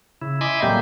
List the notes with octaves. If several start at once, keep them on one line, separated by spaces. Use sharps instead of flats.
C#3 E4
D#5 E5 G#5 B5 C6 D6
A2 F#3 G3 A#3 C4 G4